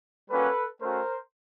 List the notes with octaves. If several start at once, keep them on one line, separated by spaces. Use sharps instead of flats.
G3 A#3 C#4 F#4 A4 B4
A3 C#4 F#4 A#4 C5